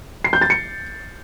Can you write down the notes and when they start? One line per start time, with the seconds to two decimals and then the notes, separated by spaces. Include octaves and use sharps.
0.24 C7
0.33 G6
0.41 A6
0.50 C#7